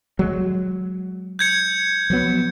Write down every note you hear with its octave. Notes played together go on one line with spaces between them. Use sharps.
F#3 G#3
G6 G#6 C#7
F3 F#3 B3